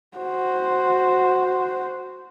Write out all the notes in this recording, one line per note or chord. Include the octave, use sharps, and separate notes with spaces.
F#4 C5